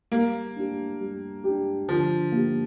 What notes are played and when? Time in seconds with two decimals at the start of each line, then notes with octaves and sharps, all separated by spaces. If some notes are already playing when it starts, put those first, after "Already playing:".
0.12 G3 A#3
0.56 D4 G4
1.00 G3
1.44 D4 G4
1.88 D3 F3
2.32 A#3 G4